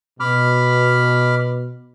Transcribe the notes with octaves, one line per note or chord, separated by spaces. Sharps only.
B2 B5 D6 F6